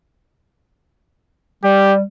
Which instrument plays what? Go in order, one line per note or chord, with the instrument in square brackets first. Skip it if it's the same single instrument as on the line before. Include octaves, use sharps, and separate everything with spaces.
[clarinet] G3 [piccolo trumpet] G4